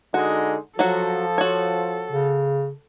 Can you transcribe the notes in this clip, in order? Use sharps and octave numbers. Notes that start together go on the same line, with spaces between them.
D3 G#3 D#4 F#4
F3 F#3 F#4 A4
F#4 C#5
C#3